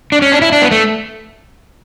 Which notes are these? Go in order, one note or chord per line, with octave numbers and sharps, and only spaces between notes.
D4
C#4
D4
E4
D4
B3
A3